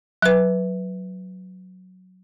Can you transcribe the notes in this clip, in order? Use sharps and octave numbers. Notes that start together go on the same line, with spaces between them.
F#3 B4